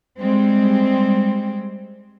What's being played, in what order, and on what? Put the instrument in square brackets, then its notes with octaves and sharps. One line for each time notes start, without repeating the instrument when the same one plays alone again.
[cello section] G3 G#3 C4